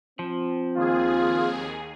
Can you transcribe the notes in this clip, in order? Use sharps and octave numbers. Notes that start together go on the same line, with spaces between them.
F3 C4
D#2 F4 G#4